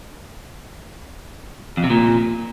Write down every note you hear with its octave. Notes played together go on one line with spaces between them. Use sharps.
F2
C3
A#2